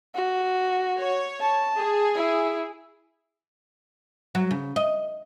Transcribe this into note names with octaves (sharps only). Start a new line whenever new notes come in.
F#4
C#5
A5
G#4
E4
F#3
C#3
D#5